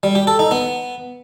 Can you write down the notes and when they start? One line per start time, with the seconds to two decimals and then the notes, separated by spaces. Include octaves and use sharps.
0.03 G3
0.15 G4
0.27 A4
0.39 D#4
0.51 B3